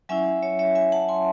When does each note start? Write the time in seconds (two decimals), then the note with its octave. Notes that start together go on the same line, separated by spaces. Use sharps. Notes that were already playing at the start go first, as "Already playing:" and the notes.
0.09 F#3 C#4 E4 E5 G#5
0.43 C#5 E5
0.59 C#5 E5
0.75 E5 G#5
0.92 F#5 A5
1.09 G#5 C6